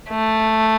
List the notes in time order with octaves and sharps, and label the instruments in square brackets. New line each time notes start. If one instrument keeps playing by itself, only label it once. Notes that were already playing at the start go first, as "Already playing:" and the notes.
[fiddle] A3